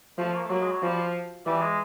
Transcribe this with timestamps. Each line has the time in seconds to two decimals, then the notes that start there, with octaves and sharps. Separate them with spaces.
0.18 F3 A3
0.35 A#3
0.43 A3
0.50 F#3 A#3
0.61 G#3
0.71 F#3
0.83 F3 G3
1.46 E3 G3
1.62 G#3